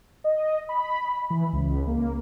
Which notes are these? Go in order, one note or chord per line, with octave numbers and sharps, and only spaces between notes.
D#5
B5
E3
C#2
A#3